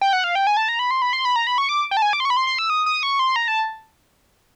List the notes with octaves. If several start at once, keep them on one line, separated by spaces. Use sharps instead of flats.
G5
F#5
F5
G5
G#5
A5
A#5
B5
C6
B5
C6
B5
A#5
B5
C#6
D6
G5
A5
G#5
D6
C6
C#6
B5
C6
C6
E6
D#6
D#6
C#6
C6
A#5
A5